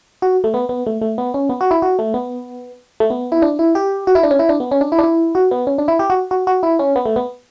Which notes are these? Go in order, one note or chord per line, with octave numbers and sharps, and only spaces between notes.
F#4
A3
B3
B3
A3
A3
B3
C#4
B3
F#4
E4
F#4
A3
B3
A3
B3
E4
D4
E4
G4
F#4
E4
D4
C#4
E4
D4
B3
C#4
D4
E4
D4
E4
F#4
B3
C#4
D4
E4
G4
F#4
F#4
F#4
E4
C#4
B3
A3
B3